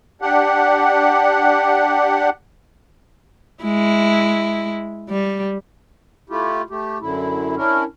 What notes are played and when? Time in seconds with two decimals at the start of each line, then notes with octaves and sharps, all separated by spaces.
0.22 D4 G4 F#5
3.63 G#3 E4
5.09 G3
6.30 A3 E4 F4 G4
6.70 A3 G4
7.01 F#2 D3 E4
7.57 C#4 D4 E4 A#4